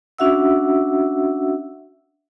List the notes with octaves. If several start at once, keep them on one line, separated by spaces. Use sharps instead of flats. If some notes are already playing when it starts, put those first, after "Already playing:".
C#4 D4 F#4 E5 F#5 E6